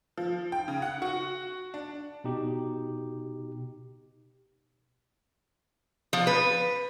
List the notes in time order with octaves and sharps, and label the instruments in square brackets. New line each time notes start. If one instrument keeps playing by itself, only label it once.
[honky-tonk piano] F3
G5
C#3
F#5
F#4
D4
[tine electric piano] B2 D#4 G4
[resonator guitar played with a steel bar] F3
B4